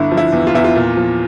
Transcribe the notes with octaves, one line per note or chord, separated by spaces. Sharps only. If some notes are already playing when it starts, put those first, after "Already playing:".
Already playing: G1 D3 E4
F3
E4
E2
F4
E2 E4
F4
A#2
F3